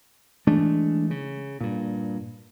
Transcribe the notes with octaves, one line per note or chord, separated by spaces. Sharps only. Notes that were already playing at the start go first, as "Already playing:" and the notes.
E3 G#3 A3 D4
C#3
G2 A#2